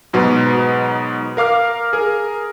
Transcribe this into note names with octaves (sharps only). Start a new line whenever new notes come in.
G#2 B2 F#3 B3
A#4 F5 D6 F6
G#4 A#4